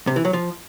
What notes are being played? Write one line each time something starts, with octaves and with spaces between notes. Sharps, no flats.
C3
E3
F#3
F3